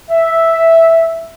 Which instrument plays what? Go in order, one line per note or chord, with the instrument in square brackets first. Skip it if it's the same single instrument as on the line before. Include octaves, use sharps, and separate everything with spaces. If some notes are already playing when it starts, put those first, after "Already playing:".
[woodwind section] E5